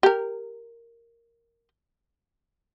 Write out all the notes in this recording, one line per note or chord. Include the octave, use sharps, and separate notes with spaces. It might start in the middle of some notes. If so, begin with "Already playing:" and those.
G4 A#4